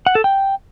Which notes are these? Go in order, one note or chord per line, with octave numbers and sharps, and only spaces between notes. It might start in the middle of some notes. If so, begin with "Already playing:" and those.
F#5
A4
G5